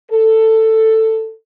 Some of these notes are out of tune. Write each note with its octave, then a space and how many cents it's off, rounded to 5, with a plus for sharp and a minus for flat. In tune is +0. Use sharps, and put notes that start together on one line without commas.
A4 +10